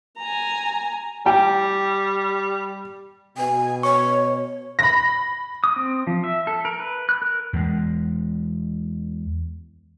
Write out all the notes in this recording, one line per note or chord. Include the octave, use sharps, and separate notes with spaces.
G#5 A#5
G3 G5
B2 G#5
C#5 C#6
B5 A#6
D#6
C4
F3
E5
A4
A#4
B4
F#6
A#4
E2 G#3